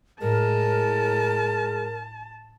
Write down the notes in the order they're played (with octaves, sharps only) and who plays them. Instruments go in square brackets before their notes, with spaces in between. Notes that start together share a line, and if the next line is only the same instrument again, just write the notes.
[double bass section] A2 [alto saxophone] G#3 [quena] A#4 [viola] A5